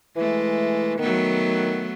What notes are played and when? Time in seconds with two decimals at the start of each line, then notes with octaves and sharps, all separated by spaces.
0.16 E3 G#3 A3
0.99 D#3 F#3 A3 B3